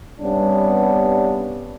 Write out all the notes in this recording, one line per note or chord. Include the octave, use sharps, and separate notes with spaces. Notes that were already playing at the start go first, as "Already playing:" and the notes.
G2 C3 G3 B3 C#4 D4